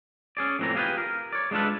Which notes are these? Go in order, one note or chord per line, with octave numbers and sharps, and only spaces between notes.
C#4 G#4 D5
F2 A2 E3 C4 A#5
F4 G4 G#4 A#4 B4 G5
A#4
C#5 D5
G#3 B3 D4 F4 A4 B4